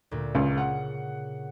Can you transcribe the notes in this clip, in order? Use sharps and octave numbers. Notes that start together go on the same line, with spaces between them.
D2 A#2
C#2 C#3 F6
F#5